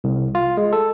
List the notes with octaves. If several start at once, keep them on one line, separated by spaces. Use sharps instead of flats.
C2
F4
G#3
A4